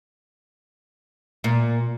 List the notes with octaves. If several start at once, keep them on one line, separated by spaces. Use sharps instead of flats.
A#2